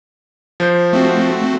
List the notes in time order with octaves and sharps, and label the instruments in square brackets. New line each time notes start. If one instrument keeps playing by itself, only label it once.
[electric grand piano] F3 C5 G6
[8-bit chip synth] A3 C4 F#4